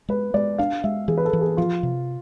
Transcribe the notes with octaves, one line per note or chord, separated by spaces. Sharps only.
G#3 B4
G#3 D5
D4 F5
G#3 E5
E3 G#4
B4
A4
E3
G#4
F3 F4
C3